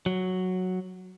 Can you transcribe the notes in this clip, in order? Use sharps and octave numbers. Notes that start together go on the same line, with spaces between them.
F#3